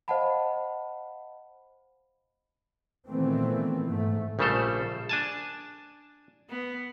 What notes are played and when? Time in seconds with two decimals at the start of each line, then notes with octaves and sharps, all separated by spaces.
0.08 C5 D#5 F5 F#5 A5 B5
3.08 A#2 D#3 E3 A3 B3 C4
3.87 G#2 A3
4.39 A#1 C#3 G3 A3 A4 C5
5.09 D4 G#5 A5
6.50 B3